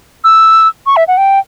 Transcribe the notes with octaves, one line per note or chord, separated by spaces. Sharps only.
E6
C#6
E5
F#5
G5